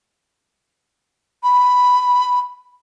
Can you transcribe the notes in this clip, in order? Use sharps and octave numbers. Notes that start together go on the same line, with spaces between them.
B5